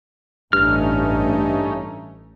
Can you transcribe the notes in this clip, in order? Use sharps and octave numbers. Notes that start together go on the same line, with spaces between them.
A1 G2 A3 C#4 D#4 F6